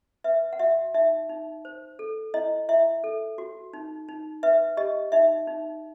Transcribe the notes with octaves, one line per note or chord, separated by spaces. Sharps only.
B4 E5
F#5
F#4 E5
D#4 E5
D#4
C5
A4
E4 D#5
E4 E5
A4
F#4
D#4
D#4
B4 E5
G4 D#5
D#4 E5
D#4